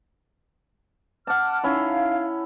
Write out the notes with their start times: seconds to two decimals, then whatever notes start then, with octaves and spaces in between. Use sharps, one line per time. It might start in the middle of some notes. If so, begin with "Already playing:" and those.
1.27 F#5 A5 D6 F6
1.64 C#4 D#4 E4 F5